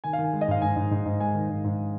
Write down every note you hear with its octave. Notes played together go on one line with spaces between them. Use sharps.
D#3 G#5
F5
D#3
G#5
G#3
D#5
G#2 F5
G#2 G#5
G#2
G#2
G#2
G#3 G#5
D#3
G#2
G#2